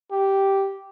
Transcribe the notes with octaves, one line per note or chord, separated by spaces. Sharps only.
G4